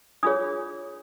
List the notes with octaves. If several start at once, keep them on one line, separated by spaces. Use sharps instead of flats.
D4 F4 G#4 C#5 D#6